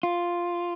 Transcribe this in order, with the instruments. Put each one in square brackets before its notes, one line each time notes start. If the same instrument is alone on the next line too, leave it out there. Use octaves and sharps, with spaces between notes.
[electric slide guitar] F4